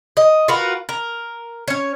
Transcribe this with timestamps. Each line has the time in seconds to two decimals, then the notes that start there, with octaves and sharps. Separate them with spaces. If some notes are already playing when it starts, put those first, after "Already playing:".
0.17 D#5
0.48 F4 F#4 A#4 B4
0.89 A#4
1.68 C#4 C#5